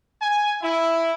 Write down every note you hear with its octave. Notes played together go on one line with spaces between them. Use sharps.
G#5
E4